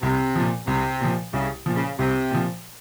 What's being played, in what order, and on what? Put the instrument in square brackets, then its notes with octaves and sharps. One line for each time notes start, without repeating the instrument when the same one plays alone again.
[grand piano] C2 [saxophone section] C3
[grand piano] A#2 F3
[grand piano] C2 [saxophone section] C3
[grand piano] A#2 F3
[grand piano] C2 [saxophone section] C#3
[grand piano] A#2 F3
[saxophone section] C#3
[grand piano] C2 [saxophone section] C3
[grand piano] A#2 F3